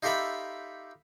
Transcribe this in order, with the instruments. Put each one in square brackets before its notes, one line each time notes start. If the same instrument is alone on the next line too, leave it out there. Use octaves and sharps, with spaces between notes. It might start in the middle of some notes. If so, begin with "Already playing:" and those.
[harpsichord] D#4 F4 G4 A4 E5 B5